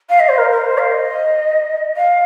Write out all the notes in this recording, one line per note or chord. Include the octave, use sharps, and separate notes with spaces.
F5
D#5
C5
A#4
A#4
C5
F5
D#5
F5